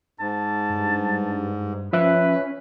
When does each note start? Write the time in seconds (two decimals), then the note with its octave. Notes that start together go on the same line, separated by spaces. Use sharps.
0.20 G#2 A5
0.70 G2
1.93 F3 C#4 B4 E5 F#6